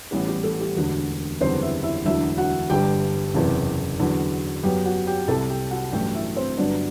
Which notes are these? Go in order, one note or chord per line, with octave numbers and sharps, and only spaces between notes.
A1 A2 E3 G3 B3 B4
G3 G4
A3 A4
G3 G4
E1 D2 D3 F#4
F#1 E2 D3 G3 B3 C4 C5
E4 E5
E4 E5
E1 D2 D3 F#3 E4 E5
F#4 F#5
G1 G2 D3 G3 G4 G5
F#1 E2 C3
E2 D3 F#3
F#2 F#3 B3 G4 G5
F#4 F#5
G4 G5
C2 C3 G3 A4 A5
G4 G5
F#4 F#5
A1 G2 F#3 A3 G4 G5
E4 E5
C4 C5
G1 G2 F#3 B3 D4 D5